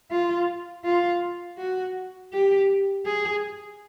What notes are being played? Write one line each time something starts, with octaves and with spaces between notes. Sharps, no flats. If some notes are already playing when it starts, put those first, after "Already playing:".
F4
F4
F#4
G4
G#4